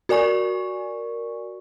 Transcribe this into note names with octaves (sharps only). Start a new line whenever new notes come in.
F#4 A#4 D5 G#5 C#6